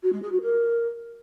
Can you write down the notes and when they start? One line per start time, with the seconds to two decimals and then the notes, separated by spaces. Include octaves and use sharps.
0.03 F#4
0.12 G#3
0.22 G#4
0.32 F#4
0.41 A#4